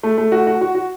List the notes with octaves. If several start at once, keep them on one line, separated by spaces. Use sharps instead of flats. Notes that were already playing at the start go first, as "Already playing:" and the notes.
A3
A3
F#4
F#4
F#4
F#4